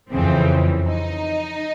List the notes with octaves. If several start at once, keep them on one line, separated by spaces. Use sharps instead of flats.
F2 C#3 E3 C4
D#4